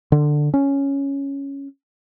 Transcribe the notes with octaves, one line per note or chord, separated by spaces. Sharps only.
D3
C#4